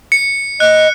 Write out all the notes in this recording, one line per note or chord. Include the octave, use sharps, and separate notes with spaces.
C#7
D#5 F#6